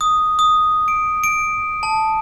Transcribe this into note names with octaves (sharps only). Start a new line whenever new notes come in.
D#6
D#6
D7
D7
A5